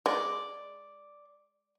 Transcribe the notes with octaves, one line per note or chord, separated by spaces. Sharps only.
G#3 D5